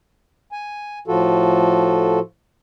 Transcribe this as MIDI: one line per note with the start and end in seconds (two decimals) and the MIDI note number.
0.52 0.99 80
1.08 2.19 45
1.08 2.19 53
1.08 2.19 65
1.08 2.19 66
1.08 2.19 69